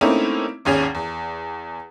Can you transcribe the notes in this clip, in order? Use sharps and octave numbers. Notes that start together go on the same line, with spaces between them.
A3 A#3 C4 C#4 D#4 E4
G#1 D#2 C#4 G#4
E2